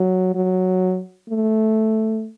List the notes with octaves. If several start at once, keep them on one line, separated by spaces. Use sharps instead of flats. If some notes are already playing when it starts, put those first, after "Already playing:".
Already playing: F#3
F#3
A3